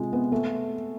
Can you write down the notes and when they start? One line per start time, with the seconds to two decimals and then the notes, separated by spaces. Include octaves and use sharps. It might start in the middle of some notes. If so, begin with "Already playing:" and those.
Already playing: C3 G#3 F4
0.13 B3
0.32 A3